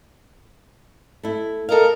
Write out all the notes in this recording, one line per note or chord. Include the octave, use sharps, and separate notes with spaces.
A3 E4
A4 A#4 D#5 F5